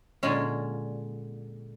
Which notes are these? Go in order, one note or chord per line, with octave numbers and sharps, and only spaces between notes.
A#2 D3 G#3 C#4